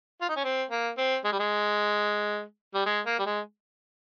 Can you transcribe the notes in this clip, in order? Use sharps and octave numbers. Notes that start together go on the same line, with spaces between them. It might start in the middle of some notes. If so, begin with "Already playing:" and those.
F4
D#4
C#4
C4
A#3
C4
G#3
G3
G#3
G3
G#3
A#3
G3
G#3